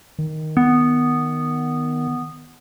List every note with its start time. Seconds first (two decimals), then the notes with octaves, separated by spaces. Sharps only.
0.19 D#3
0.57 B3